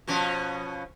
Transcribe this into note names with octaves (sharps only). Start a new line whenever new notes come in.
B2 F3 C#4